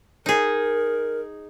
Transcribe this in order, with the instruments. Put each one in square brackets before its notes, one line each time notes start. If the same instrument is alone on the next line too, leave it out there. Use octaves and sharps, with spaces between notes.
[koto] D#4 G#4 [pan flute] A#4